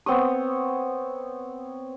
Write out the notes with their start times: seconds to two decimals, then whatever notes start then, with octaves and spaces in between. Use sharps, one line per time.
0.06 B3 C4 C#5 D#6